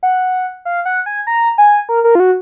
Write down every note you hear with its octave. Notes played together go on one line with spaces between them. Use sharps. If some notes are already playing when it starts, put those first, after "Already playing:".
F#5
F5
F#5
G#5
A#5
G#5
A#4
A#4
F4
F#4